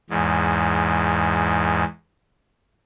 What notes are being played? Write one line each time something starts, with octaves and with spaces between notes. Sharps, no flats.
E2 G#2